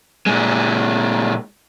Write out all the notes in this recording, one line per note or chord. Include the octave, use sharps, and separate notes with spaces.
A#2 G#3